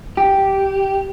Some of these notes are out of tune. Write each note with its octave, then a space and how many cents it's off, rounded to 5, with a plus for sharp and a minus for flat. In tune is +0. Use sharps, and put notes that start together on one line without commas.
G4 -5